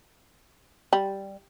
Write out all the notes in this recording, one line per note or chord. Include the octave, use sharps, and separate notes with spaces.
G3